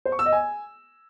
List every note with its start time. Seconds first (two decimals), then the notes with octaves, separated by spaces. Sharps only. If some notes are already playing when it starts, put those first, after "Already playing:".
0.05 C5
0.12 C#6
0.19 E6
0.26 D#5
0.33 G#5